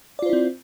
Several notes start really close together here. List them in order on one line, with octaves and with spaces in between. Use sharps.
D5 F4 C5 E4 C4